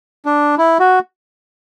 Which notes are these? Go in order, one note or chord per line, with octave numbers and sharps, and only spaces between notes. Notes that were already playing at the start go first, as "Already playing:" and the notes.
D4
E4
F#4